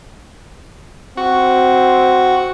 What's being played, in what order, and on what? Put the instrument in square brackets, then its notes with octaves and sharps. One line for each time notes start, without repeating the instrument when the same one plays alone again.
[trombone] C4 [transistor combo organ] F#4